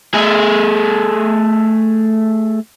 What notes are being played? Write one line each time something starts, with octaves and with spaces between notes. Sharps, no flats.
A3 G#4